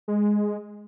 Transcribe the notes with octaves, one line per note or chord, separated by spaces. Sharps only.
G#3